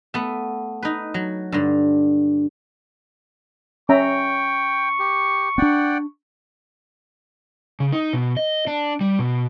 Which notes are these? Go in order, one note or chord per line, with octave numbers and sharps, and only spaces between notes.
A3 B3
D#4 B4
F#3
G2 D3
C#4 E5 G5 A#5 C#6
G4
C4 D4 D5 F#5 G5
C#3
D#4
B2
D#5
D4
G3
B2